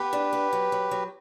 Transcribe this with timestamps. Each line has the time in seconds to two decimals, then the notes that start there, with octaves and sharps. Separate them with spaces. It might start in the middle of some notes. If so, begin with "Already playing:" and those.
Already playing: B3 G4 B4
0.13 D4
0.33 B3
0.53 F#3
0.72 F#3
0.91 F#3